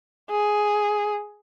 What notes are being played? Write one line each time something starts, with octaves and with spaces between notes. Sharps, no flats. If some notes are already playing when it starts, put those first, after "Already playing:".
G#4